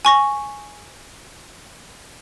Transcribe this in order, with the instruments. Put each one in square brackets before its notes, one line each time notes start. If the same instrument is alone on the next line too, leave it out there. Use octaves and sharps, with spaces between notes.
[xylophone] G#5 C#6 A#6